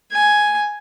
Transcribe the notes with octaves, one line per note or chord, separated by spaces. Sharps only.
G#5